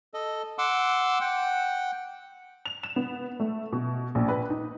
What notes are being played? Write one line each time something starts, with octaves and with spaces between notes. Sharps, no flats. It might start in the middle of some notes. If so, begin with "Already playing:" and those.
A4 D#5
F#5 C6 D6 E6
F#5 G5
F7
E7
B3
A3
B2
A#1
B4
D#4